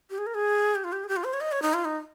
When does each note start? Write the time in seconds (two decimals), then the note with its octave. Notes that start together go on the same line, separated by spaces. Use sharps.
0.10 G4
0.18 G#4
0.26 A#4
0.35 G#4
0.75 G4
0.84 F4
0.92 G4
1.04 G#4
1.09 G4
1.16 F4
1.24 C5
1.33 C#5
1.41 D#5
1.52 C#5
1.62 D#4
1.74 F4
1.85 D#4